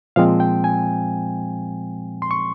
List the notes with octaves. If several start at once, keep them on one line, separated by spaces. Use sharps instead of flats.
A#2 F3 G#3 C4 F5
G5
G#5
C6
C#6